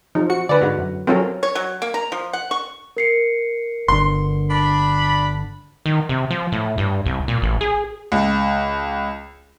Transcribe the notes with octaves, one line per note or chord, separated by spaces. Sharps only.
F3 D#4
F#4 C#7
D3 B4 D5
G#2 F#4
F#2
F#3 C4 C#4 F4 A4 A#4
C#5
F#3
A#3
A#5
F3
F#5
C#6
A#4 C7 C#7
G1 D3 C6
D4 B5
D#3
C3
F3
A2
G2
C2
A#2
A1
G#4
C#2